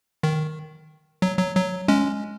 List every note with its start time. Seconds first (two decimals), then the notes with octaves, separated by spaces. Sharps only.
0.23 D#3
1.22 F#3
1.38 F#3
1.56 F#3
1.88 G#3 C#4